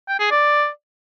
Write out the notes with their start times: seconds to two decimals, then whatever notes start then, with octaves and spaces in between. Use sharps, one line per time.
0.09 G5
0.20 G#4
0.31 D5